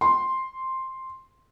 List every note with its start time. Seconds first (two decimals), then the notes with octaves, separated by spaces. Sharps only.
0.01 C6